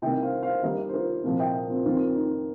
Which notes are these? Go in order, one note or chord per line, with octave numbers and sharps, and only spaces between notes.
C2 C3 D#3 A#3 D#5 G5
C5 F5
C5 F5
D#2 D#3 G3 A#3 A#4 D#5
C5
F4 A#4
C2 A#2 F3 A#3 C4 F4
D#5 G5
C4 F4
F2 D#3 A#3 C4 F4
D#4